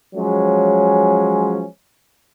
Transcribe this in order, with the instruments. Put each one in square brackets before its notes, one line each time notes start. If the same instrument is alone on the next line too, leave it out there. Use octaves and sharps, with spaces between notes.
[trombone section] F3 F#3 G#3 C#4